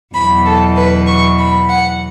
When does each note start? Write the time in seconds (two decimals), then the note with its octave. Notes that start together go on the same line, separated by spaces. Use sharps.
0.14 E2 B2 F#3 B5
0.44 A4
0.76 B4
1.07 C#6
1.38 B5
1.69 F#5